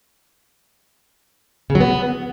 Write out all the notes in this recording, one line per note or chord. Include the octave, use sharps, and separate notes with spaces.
C#3
F#3
B3